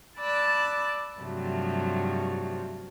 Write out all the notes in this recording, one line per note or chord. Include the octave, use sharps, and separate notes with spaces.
D5 A5 B5 D6 E6 F#6
G2 C3 F3 F#3 A3